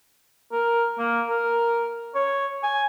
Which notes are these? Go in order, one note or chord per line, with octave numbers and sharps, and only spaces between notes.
A#4
A#3
A#4
C#5
G#5